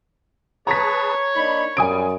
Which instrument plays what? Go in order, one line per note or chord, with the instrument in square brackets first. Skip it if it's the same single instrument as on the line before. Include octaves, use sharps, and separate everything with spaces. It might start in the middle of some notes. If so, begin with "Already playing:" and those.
[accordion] G#4 B4 A5 [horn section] C#5 [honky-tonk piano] A#5 B6
[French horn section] A#3 D4 D#4 [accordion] B5
[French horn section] F#2 [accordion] G3 [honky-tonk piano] G#5 D#6 D7